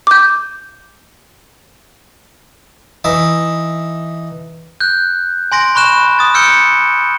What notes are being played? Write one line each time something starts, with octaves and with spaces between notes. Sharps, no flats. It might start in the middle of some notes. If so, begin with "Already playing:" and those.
D6 G6
E3 D#4 E5 D6
F#6 G6
G#5 C6 A#6 D7
B5 C#6 F#6 E7
D#6 A6
E6 F6 G6 C#7 D7 G7